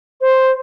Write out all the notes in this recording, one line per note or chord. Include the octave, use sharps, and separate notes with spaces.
C5